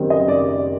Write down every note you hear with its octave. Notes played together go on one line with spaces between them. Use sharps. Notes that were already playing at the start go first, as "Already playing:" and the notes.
Already playing: F#1 F#2 D#3 G3 C4
D#5
D5